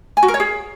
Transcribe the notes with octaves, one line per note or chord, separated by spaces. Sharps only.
G#5
F#4
A#4
C#5
G#4